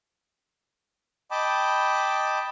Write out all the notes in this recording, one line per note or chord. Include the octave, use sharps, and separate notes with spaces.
D#5 G5 A5 B5 D6